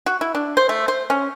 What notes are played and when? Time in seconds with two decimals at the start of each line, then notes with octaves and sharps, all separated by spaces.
0.06 F#4
0.21 E4
0.35 D4
0.57 C5
0.69 A3
0.88 C5
1.10 C#4